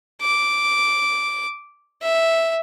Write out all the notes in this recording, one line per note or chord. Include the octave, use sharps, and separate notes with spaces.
D6
E5